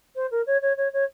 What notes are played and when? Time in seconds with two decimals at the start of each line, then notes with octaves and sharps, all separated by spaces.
0.15 C5
0.31 A#4
0.46 C#5
0.62 C#5
0.77 C#5
0.93 C#5